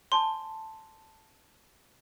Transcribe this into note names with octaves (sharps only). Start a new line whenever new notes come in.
C#5 G#5 A5 C6